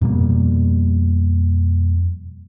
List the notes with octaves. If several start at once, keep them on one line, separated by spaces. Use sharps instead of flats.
F2 B2 G3 A#3